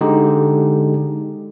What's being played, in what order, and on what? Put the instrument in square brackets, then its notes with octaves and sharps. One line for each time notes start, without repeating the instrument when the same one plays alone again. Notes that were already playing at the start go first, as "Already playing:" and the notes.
[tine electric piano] D3 G#3 D#4 G4